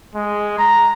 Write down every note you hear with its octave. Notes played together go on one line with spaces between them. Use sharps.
G#3
A#5